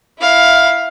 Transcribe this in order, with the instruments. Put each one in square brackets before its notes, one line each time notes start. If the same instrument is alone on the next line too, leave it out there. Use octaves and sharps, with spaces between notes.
[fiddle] E4 F5